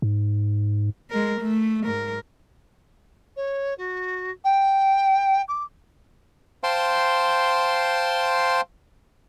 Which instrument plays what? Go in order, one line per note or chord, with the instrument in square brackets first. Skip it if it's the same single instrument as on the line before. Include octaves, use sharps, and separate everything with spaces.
[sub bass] G#2
[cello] G#3 A#4
A3
G#2 A#4
[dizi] C#5
F#4
G5
D6
[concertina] C5 F5 G5 A5 C6